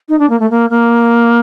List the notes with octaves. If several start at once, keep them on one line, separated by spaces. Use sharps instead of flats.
D#4
D4
A#3
A3
A#3
A#3